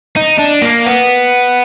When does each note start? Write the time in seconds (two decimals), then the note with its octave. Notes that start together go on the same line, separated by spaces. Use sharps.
0.17 D#4
0.39 D4
0.62 A#3
0.87 B3